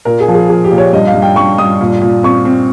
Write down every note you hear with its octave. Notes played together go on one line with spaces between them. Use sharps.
A#2 A#4
G#4
F3
G#4
F3 G#4
G4
A#2
C#5
G2 D#5
F5
G2
G5
G2 C#6
G2 D#6
A#2
A#2
C4 C#6
C4